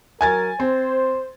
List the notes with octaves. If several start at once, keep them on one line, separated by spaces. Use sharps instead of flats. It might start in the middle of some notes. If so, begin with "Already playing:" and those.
F#3 A#4 G#5 G#6 A6
C4 C5